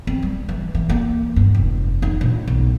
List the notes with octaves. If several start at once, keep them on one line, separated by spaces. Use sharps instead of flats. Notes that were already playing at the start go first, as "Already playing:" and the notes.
C4
G3
E3
E3
A#3
G2
F1
D#4
A#1
B1